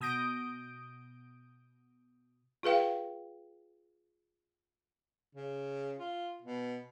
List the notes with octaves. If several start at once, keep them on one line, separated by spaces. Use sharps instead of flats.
B2 D#6 G6 A#6 D7
F4 G#4 B4 F5 G5
C#3
F4
B2